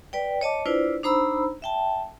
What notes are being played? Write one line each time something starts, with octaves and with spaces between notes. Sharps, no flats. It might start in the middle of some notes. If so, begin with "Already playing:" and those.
B4 D5 G5
C#5 D#5 A5 D6
D4 E4 F4 B4 C5 D5
D4 D#4 C5 A#5 B5 E6
E5 G5 A5